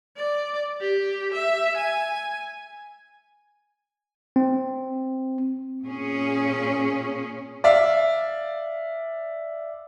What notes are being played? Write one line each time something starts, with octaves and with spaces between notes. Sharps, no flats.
D5
G4
E5
G#5
C4
A#2 C#4 G#4
D5 E5 F5